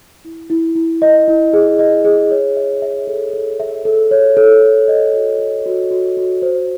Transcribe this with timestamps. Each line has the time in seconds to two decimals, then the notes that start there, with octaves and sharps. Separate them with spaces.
0.25 E4
0.50 E4
0.76 E4
1.02 D#5
1.28 E4
1.53 G#4
1.79 D#5
2.05 G#4
2.31 C#5
2.57 E5
2.82 E5
3.07 A4
3.33 A4
3.60 E5
3.85 A4
4.11 C#5
4.37 A4
4.62 A4
4.88 D#5
5.14 F#4
5.39 A4
5.66 F#4
5.91 F#4
6.17 F#4
6.42 C5